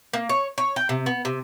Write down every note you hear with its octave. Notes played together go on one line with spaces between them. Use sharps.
A#3
C#5
C#5
G5
C3
B3
C3